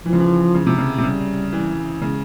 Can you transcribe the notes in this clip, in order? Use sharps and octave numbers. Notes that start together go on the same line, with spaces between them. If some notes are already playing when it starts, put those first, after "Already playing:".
E3 F3
C#3
E3
C#3
C3
C#3
C3
C#3 G3
E3
C#3 G#3